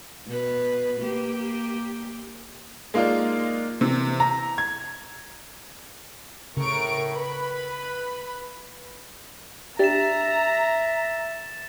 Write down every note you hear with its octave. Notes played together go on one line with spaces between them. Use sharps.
B2 B4
A#3 G4
G#3 A#3 D#4 F4 D5
C3 E3
A#5
G#6
A2 C#3 A#4 C#6 D7
B4 B5
D4 G4 E5 A#5 A6 E7